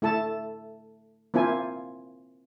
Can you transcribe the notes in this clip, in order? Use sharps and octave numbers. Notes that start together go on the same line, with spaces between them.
A3 E4 A4 A5
A#3 C4 E4 F4 G#5